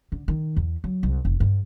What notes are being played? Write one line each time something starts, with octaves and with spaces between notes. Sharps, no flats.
D3
D#3
E2
F#3
C2
F1
G2